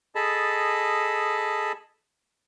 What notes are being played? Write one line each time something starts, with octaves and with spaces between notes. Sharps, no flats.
G#4 A4 D#5 A5 B5